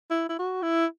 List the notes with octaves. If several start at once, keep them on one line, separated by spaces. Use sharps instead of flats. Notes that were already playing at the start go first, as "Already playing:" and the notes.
E4
E4
F#4
E4